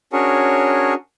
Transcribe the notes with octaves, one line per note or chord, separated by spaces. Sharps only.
C#4 D4 F#4 G#4 A#4 C#5